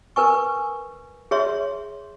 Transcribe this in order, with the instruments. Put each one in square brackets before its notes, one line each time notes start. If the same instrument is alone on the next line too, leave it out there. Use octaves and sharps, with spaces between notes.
[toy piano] A#4 B4 G#5 C#6
G#4 C#5 E5 C6